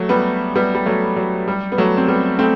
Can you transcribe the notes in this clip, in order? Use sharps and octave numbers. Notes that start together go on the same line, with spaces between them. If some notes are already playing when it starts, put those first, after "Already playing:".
Already playing: F#3 A3
G3 B3
G3 B3
G3
F#3 A3
F#3
G3
B3
F#3 A3
C4
G3 B3
A3 C4